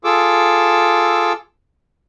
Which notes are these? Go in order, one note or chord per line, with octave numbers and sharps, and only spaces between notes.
F4 G#4 A4 D6 E6